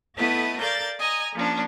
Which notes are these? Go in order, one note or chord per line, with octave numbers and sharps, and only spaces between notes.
A3 B3 E4 A4 B4 D#5
A4 A#4 D5 F5 G6 A6
D#5 G#5 A#5
F3 A#3 C#4 D4